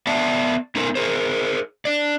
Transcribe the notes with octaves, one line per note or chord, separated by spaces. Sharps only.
B3 D5 E5 A5
B3 C#4 D#4 A#4 C5
G#4 A#4 C5
D4 D5